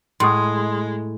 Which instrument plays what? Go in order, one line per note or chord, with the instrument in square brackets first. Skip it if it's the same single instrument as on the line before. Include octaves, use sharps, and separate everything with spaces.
[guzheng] A2 [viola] G#3 [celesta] C6 D#6